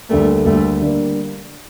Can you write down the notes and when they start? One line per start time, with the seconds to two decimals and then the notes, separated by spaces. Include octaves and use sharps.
0.09 D2 D3 G3 A3 A#3
0.45 D2 D3 G3 A3 A#3
0.82 D3 G3 A#3